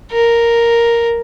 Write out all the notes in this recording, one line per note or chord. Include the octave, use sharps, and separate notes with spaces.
A#4